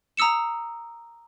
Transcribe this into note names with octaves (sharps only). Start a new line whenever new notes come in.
A#5 D#6 E6 C#7 E7